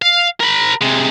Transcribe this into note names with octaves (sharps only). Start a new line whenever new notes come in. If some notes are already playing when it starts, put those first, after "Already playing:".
F5
A#4 B5
C3 G#3